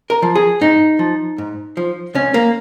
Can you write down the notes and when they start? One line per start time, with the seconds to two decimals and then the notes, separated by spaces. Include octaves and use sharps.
0.10 A#4
0.22 F3
0.35 G#4
0.61 G#2 D#4
0.99 F3
1.38 G#2
1.77 F3
2.15 C#2 C#4
2.34 A#3